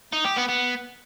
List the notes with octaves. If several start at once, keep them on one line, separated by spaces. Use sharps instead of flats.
D#4
G4
B3
B3